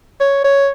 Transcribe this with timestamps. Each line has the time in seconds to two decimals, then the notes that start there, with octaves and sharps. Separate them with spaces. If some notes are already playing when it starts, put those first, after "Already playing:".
0.21 C#5
0.44 C#5